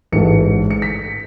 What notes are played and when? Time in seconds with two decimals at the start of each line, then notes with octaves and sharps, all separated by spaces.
0.12 A1 G#2 E3 A3 C#7
0.71 C#7
0.82 B6